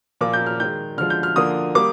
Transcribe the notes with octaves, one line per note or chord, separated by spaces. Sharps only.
A#2 F3 A#3 D6
G6
F6
D#3 G#3 G6
D3 F3 G#3 F6
G6
F6
D3 F3 A#3 D#6
G3 A#3 D6